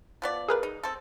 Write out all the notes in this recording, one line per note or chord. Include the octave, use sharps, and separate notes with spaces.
F3 B3 D5
G#4 A#4 B4
D#4
C4 A4